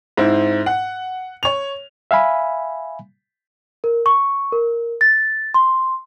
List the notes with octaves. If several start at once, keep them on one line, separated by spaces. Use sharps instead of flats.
G#2 C4 E4
F#5
C#5 F7
E5 F5 G#5 B5
A#4
C#6
A#4
A6
C6